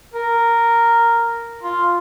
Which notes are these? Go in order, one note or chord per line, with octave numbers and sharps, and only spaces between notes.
A#4
F4